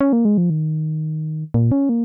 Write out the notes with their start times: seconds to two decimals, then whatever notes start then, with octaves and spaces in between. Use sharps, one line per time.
0.01 C#4
0.13 A#3
0.25 G#3
0.38 F3
0.50 D#3
1.54 A#2
1.72 C#4
1.89 A#3